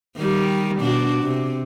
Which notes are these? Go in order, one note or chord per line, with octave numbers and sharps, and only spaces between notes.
D#3 G3
B2 D4 F#4
C3